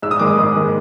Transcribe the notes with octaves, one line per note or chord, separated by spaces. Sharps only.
G#2 E6
D#6
D#3 G#3 D6
D#6
G#2
D#3 G#3